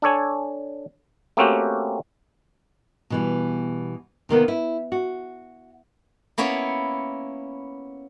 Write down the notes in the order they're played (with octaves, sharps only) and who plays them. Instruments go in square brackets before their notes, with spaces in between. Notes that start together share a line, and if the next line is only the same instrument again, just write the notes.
[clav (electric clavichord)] D4 A4 C#5 G#5
A3 A#3 C4 C#4 F#4 G4
[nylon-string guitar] B2 E3 G3
C3 D#3 A#3 B3
E4
F#4
[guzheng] A#3 B3 C#4 E4 C#5